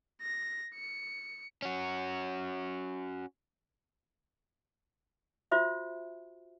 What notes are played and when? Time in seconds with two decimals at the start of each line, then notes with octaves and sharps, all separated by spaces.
0.21 A#6
0.75 C#7
1.62 C#4 F#4
5.51 F4 F#4 C5 E5